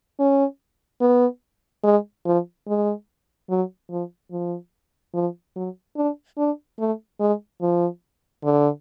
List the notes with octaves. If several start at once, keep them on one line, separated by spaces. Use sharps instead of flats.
C#4
B3
G#3
F3
G#3
F#3
F3
F3
F3
F#3
D4
D4
A3
G#3
F3
D3